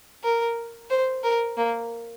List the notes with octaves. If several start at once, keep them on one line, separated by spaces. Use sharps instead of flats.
A#4
C5
A#4
A#3